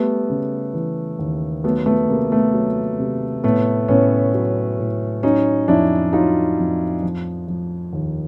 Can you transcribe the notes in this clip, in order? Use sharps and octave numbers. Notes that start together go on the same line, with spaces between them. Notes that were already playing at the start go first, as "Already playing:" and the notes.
Already playing: G3 A3 B3
C#3
E3
D#2
F#3 A3 B3
A3 B3
C3 A#3
A3 B3
F#3
C3
A2 A3 B3
A2 B3 C#4
F#3
A2
F#3 C#4 D#4
F2 D4 E4
F#3 D#4 F4
F2
F3
F3
D#2